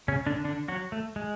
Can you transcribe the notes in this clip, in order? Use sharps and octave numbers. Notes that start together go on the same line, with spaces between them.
C#3 C#4
D3 D4
D3 D4
F#3 F#4
A3
G#3